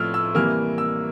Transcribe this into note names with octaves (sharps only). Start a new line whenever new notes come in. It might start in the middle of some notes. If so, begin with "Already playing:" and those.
Already playing: A2 F3 A3 E6 F6
E6
C3 E3 G3 A#3 F6
E6